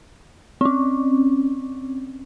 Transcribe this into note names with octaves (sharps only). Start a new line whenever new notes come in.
C4 C#4